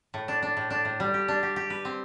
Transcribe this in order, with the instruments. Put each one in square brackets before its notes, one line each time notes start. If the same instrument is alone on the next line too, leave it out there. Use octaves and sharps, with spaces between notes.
[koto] A2
D4
D4
A2
D4
A2
G3
G4
D4
G4
G4
B4
C4